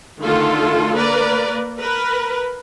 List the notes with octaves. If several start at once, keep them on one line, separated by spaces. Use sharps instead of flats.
D3 D#3 A3 F4 A4
A#3 A#4 B4 D5
A#4 B4